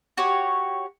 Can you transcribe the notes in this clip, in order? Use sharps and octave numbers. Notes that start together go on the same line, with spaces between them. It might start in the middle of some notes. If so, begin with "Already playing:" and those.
F#4 G4 C#5